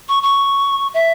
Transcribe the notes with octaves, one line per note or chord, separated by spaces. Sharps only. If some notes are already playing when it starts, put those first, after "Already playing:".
C#6
C#6
E5